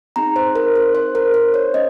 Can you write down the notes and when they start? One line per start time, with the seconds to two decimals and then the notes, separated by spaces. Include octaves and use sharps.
0.16 C4 D#4 G#4 A#5
0.36 C5
0.55 A#4
0.75 C5
0.95 C5
1.15 A#4
1.34 C5
1.54 C#5
1.74 C#4 D#5